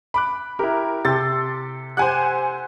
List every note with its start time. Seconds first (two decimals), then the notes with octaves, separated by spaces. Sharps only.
0.14 B5 D6 F#6
0.59 E4 G4 A#4
1.05 C3 G4 A4 C6 A6
1.97 G4 C5 F#5 G#5 F#6